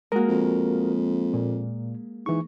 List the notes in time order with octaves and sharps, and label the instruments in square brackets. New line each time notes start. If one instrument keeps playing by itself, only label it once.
[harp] G#3 A#3 [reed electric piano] F#4 A#4
[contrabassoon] F2
[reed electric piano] A#2
[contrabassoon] G#2 [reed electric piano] E3 C#6